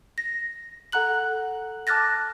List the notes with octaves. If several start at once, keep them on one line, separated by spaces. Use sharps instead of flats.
A#6
A4 F#5 A#5 F#6 F#7
A5 D6 F6 F#6 A6 A#6